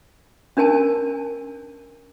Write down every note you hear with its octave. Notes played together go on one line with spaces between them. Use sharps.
C#4 D4 A#4 G#5 A5